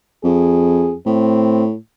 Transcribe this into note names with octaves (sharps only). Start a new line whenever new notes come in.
F2 G#4
A2 C4